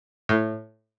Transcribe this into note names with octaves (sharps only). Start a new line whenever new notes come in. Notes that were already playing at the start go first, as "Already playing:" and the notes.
A2